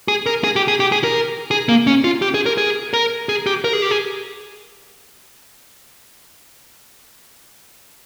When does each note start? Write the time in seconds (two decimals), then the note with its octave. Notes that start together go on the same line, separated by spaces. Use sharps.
0.08 G#4
0.26 A#4
0.44 G#4
0.56 G4
0.68 G#4
0.80 G4
0.92 G#4
1.04 A#4
1.51 G#4
1.69 A#3
1.87 C#4
2.04 F4
2.22 G4
2.34 G#4
2.46 A#4
2.58 G#4
2.93 A#4
3.29 G#4
3.46 G4
3.64 A#4
3.73 G#4
3.82 G4
3.91 G#4